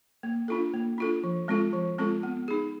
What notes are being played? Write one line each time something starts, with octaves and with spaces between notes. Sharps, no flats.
A#3
D4 F4 A4
A#3
D4 F4 A4
F3
G#3 C4 F4 A4
F3
G#3 C4 F4 A4
B3
D#4 G#4